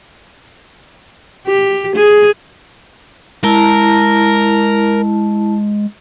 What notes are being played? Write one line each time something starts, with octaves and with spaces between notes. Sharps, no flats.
G4
G#4
G#3 E4 A#4 A5